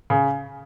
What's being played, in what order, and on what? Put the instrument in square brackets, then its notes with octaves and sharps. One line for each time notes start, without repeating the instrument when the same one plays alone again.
[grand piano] C#3